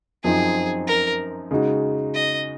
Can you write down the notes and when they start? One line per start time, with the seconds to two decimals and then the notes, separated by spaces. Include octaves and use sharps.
0.23 F#2 F3 C4 D#4 G#4
0.87 A#4
1.51 C#3 G#3 D#4 F#4
2.15 D#5